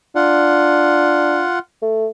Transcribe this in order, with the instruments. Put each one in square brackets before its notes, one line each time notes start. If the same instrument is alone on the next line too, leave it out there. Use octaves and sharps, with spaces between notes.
[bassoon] D4 [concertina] F4 F#5
[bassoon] A3